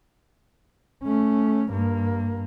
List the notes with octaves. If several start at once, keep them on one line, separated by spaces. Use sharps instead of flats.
A3 C#4
G2 A#3